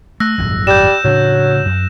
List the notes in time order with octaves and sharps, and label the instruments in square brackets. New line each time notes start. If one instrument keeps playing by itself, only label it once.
[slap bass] A3 [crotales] E6 F#6 A#6
[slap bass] D#1 G#1 F#2
[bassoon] G3 [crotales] G6 E7
[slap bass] A2 C#3 D4 [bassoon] F#3
[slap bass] F#2